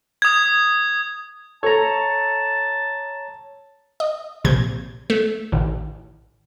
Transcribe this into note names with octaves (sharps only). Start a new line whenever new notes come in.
D#6 G#6
A4 C#5 A5 A#5
D#5
A#1 C3 G6 G#6
A3
A1 D#3